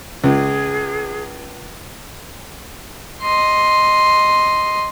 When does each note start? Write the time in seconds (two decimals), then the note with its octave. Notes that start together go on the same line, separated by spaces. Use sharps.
0.24 C#2 G#4
3.22 D#5 C6